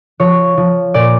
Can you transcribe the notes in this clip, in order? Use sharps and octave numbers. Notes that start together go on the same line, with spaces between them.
F3 C#5
F3
A#2 D5